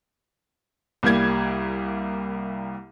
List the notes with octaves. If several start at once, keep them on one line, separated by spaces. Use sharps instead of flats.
C2 G3 A#3 G#6